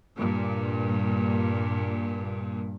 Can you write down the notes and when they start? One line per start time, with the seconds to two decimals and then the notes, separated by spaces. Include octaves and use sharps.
0.19 G2 A#2